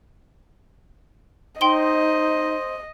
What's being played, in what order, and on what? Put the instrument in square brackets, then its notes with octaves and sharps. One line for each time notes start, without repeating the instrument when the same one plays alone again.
[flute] D#4 [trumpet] C5 [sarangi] D#5 [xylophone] G5 C6 G7